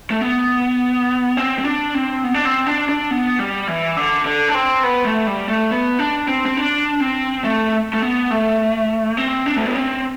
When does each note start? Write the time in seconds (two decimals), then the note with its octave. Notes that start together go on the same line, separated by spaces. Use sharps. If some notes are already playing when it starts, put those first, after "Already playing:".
0.11 A3
0.21 B3
1.37 C4
1.59 C4
1.65 D4
1.94 C4
2.24 B3
2.34 D4
2.45 C4
2.67 D4
2.89 D4
3.11 B3
3.39 G3
3.68 E3
3.97 D3
4.25 D3
4.48 D4
4.54 C4
4.83 B3
5.05 A3
5.27 G3
5.49 A3
5.71 B3
5.99 D4
6.28 C4
6.46 C4
6.57 D4
7.00 C4
7.44 A3
7.93 A3
8.02 B3
8.31 A3
9.17 C4
9.46 D4
9.56 A3
9.66 B3
9.75 C4